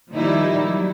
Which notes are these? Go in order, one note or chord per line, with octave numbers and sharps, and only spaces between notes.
A#2 D#3 F3 G3 D#4 E4
F#3